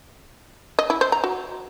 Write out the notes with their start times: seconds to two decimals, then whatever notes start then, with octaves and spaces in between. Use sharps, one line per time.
0.79 D#5
0.90 E4
1.01 C5
1.12 A#5
1.24 F#4